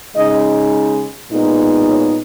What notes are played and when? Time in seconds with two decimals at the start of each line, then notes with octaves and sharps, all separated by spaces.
0.16 C#3 G#3 D#4 D#5
1.31 A#2 G#3 B3 D#4
1.88 C#5